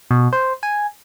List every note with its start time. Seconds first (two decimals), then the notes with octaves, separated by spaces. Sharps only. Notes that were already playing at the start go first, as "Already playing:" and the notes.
0.11 B2
0.33 C5
0.63 G#5